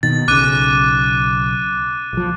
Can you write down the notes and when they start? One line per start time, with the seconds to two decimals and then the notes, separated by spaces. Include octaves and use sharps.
0.03 B2 D#3 A6
0.28 B1 C#3 D6 F#6 D#7
2.13 A#1 F3